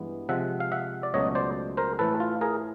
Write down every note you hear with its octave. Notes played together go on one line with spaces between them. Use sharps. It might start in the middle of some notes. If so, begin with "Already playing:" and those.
Already playing: G2 E3 G#3 B3
C3 F3 G#3 E5 F#5
F5
E5 F#5
D5
C#2 B2 F#3 A3 C#5 D#5
C5 D5
A#4 C5
A2 E3 A3 A4 B4
F4
G#4 A#4